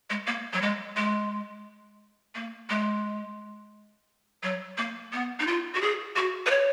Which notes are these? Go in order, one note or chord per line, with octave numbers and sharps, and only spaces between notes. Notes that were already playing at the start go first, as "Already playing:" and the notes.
G#3
A#3
F#3
G#3
G#3
A#3
G#3
F#3
A#3
B3
D#4
F4
F#4
G#4
F#4
B4
C#5